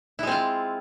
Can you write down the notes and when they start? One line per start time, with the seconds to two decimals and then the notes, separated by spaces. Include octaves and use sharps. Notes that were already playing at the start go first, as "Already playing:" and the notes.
0.19 E4
0.23 G#3
0.27 C4
0.31 F4